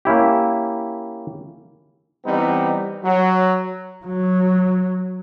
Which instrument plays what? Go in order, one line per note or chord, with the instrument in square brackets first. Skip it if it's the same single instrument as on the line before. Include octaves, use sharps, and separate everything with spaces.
[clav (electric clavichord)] A#3 C#4 E4 G4
[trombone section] E3 G3 B3 C4 D#4
F#3
[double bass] F#3